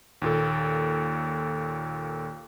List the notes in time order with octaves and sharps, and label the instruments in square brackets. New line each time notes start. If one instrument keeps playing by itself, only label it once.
[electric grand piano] D#2 A#2 A4